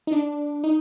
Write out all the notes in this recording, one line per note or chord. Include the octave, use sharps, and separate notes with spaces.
D#4
D4
D#4